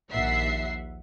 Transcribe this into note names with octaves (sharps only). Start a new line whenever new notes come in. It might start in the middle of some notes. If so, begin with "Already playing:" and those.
A#1 D#2 E5 F#5 C7